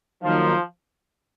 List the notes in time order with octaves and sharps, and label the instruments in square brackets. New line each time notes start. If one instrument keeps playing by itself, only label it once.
[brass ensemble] D#3 F#3 A#3 D#4 [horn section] F3